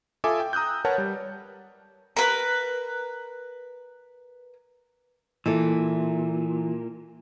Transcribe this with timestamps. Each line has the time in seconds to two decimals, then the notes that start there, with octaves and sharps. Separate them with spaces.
0.24 F4 A4 E5 G#5 D6 D#6
0.40 G5
0.53 A#5 D#6 E6 F#6 G6
0.85 A#4 B4 C#5 F#5 A5
0.98 G3
2.17 A#4 B4
5.46 A#2 E3 E4 A4